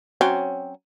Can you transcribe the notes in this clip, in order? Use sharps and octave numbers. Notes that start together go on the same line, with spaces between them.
F#3 C4 C#4